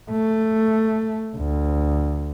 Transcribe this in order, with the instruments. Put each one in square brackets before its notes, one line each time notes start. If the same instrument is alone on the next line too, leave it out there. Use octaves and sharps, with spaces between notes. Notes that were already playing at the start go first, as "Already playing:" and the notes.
[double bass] A3
D2